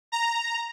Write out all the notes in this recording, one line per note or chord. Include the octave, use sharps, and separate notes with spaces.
A#5